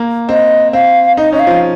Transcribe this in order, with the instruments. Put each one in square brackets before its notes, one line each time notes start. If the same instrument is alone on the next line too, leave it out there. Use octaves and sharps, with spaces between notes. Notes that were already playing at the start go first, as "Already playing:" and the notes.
Already playing: [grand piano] A#3
[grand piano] C4 [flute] D#5
[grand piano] C4 [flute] F5
[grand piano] D#4 [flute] D#5
[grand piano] C#4 [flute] D#5
[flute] F5
[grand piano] F3